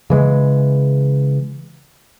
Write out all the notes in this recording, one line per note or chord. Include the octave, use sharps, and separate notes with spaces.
C#3 E3 G#3